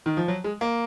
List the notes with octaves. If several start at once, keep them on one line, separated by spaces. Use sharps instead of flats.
D#3
F3
F#3
G#3
A#3